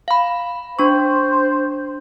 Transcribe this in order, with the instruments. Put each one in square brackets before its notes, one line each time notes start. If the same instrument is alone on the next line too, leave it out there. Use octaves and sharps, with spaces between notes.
[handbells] F5 B5
[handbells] D4 C#6 [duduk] C5